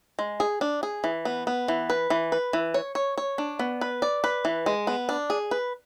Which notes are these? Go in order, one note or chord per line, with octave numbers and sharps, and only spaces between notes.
G#3
G#4
D4
G#4
E3
B3
B3
E3
B4
E3
B4
E3
C#5
C#5
C#5
D4
B3
B4
D5
B4
E3
G#3
B3
D4
G#4
B4